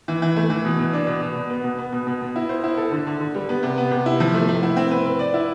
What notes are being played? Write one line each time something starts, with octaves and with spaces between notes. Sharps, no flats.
E3
E3
A3
E3
B2
B2
D4
B2
B2
B2
B3
B2
B3
B2
B2
B2
E4
C5
E4
A4
D3
D3
D3
G3
B3
C3
B3
C3
E4
F3
A3
A3
E4
C4
B4
B4
D5
E4